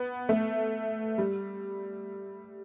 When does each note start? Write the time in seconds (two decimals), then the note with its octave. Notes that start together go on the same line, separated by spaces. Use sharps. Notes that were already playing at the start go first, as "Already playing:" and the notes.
Already playing: B3
0.29 A3
1.18 G3